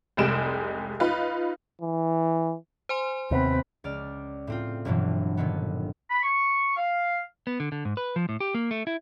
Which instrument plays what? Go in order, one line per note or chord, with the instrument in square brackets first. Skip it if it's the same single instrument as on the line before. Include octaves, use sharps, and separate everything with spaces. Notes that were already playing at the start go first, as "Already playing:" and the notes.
[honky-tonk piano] F1 C2 G3 G#3 D7 E7
D#4 F4 B4
[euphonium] E3
[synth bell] C5 G#5 C6
[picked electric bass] D#2 C3 B3 [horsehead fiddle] C4 B4
[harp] C#2 D5 F6
A2 C4 F4
G1 G2 B2 E3 F#3
A#2 D3 D#3 B3
[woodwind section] B5
C#6
F5
[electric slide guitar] B3
D3
D3
G#2
B4
F3
A2
G4
A#3
A3
E4